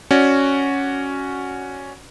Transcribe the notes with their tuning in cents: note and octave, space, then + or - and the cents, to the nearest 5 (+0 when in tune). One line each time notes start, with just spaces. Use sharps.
C#4 +0 F#4 +0 D5 +0